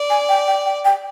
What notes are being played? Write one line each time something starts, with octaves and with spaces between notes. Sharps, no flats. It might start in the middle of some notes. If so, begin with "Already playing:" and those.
Already playing: D5
G#5
G5
G5
G5
G5